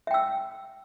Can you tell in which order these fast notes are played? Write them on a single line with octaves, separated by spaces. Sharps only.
E5 G5 E6